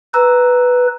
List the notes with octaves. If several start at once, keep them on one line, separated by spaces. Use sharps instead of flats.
B4 A#5 E6